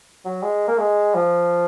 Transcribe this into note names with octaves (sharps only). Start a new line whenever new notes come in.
F#3
G#3
A#3
G#3
F3